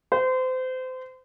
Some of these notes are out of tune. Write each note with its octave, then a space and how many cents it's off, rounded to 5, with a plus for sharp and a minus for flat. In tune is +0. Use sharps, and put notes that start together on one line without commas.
C5 -30